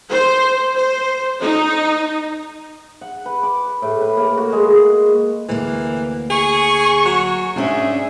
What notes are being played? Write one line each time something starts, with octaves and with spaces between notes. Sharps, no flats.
C5
C5
D#4
F#5
B4
D6
A2
B4
A#3
F#4
G#3
D2 E3 A#3
G#4 G#5 C#6
F#3
G#2 C#4 D4 G#4 E5